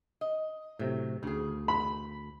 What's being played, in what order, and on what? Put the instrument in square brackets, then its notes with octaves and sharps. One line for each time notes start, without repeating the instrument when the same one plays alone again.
[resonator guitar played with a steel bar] D#5
[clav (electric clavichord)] A2 C3 [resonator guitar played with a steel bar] F#3
[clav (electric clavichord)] D2 [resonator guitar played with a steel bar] C#3 G#4
[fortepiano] B5